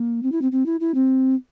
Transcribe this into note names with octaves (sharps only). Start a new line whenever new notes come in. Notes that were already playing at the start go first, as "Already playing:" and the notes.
Already playing: A#3
C4
E4
C4
C4
E4
E4
C4